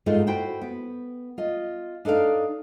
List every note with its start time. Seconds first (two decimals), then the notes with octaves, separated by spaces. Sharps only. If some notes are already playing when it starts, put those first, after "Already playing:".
0.06 G#2 G#3 A3 D#4 F4
0.27 E4 F#4 C5 G5
0.61 B3
1.38 F4 D#5
2.05 D4 D#4 A4 D5 F5